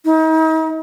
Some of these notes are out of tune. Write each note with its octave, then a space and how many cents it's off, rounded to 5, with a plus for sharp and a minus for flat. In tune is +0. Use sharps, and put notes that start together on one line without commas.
D#4 +40